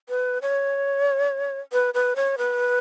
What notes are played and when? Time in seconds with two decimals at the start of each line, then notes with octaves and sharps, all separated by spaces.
0.09 B4
0.42 C#5
1.73 B4
1.94 B4
2.16 C#5
2.38 B4